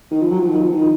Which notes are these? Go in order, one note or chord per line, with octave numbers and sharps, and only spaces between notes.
D#3
F3
F#3
F3
D#3
F3
D#3